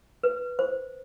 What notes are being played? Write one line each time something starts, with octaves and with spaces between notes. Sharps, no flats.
B4
C5